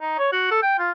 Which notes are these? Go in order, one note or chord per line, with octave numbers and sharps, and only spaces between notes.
D#4
C#5
F#4
A4
G5
F4